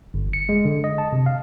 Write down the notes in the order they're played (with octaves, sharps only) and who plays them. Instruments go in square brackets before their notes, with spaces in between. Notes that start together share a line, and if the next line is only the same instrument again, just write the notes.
[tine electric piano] G1
C#7
G#3
D3
D#5
A5
C3
F5